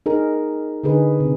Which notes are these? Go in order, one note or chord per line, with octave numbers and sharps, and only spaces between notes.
D#4 G#4 A#4
D3 D#4 G#4 B4
C3